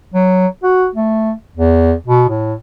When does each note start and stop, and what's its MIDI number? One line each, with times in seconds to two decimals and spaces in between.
0.14 0.47 54
0.63 0.87 66
0.95 1.32 57
1.56 1.93 40
2.07 2.25 47
2.29 2.54 45